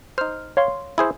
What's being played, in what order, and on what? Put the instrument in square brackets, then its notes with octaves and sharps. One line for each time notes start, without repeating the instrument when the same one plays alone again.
[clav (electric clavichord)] D#4 C5 [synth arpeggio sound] F6
[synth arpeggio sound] C#5 F5 C6
[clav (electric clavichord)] E4 G#4 C5